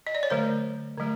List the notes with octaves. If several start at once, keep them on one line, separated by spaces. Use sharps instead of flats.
D#5
D5
C#5
D3 F#3 A3 C5
D3 F#3 A3